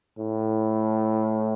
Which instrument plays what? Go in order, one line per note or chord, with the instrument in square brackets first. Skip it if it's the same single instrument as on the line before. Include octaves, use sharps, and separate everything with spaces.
[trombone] A2